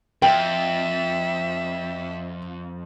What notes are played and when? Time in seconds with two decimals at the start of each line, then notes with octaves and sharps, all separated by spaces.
0.22 F2 E5 G5